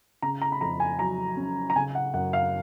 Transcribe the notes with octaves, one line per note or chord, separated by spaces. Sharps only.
C#3 A#5
A#5
B5
F2 A#5
G#5
F#3 A#5
C#4
A#5
C#3 G#5
F#5
F#2 F#5
F5